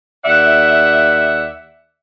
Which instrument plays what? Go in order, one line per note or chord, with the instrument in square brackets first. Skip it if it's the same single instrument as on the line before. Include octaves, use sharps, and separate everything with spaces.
[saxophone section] D#2 D5 E5 [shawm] F#5